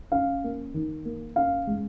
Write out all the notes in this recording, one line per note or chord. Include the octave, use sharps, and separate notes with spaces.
C#4 F5
A#3
D#3
A#3
C#4 F5
G#3